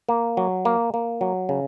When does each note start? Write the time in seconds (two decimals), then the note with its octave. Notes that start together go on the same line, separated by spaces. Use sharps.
0.09 A#3
0.37 F#3
0.65 A#3
0.94 A#3
1.21 F#3
1.49 C#3